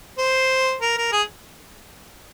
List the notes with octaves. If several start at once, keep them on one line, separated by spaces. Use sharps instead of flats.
C5
A#4
A#4
G#4